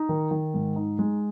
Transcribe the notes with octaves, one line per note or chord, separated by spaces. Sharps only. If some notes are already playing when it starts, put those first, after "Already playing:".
Already playing: D#4
D#3
D#3
G#2
D#4
G#3